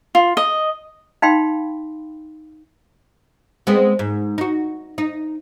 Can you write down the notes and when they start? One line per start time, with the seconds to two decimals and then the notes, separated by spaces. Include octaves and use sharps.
0.15 F4
0.37 D#5
1.22 D#4 F5 G5 B5 C6
3.67 G#3 B3 C4
3.99 G#2
4.38 D#4 F#4
4.98 D#4